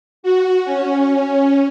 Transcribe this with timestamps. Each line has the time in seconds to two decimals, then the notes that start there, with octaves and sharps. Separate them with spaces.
0.23 F#4
0.65 C#4